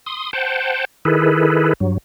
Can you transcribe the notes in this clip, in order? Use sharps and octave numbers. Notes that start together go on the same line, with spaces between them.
C6 D#6
C5 F#5 G5 A5
D#3 E4 G#4 A4 B4
G2 F#3